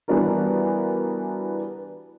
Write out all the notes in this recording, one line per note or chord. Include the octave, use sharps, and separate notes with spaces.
E3 G3 B3 D4 F#4 A#4